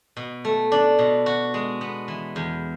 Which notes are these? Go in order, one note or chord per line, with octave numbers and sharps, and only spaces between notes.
B2
A3
D4
B2
F#4
G#3
B3
E3
E2